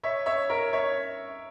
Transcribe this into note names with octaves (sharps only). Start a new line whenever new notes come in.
C#5 E5
C#5 E5
A#4 C#5
C#5 E5